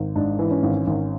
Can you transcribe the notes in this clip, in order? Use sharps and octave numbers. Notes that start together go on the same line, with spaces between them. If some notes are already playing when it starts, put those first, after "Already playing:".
Already playing: G#1
G#2 D4
E3
C#4
G#1
G#1